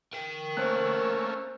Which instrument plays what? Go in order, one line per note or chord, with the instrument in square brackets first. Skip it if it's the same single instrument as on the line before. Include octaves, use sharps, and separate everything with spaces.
[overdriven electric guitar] A#4 G5
[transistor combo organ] A3 A#3 C#4 [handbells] C5 F#6